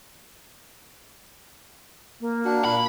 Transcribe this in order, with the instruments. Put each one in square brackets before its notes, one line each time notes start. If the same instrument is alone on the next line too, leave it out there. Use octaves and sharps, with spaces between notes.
[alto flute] A#3
[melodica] D4 [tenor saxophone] F#4
[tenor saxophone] A#2 [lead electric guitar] B5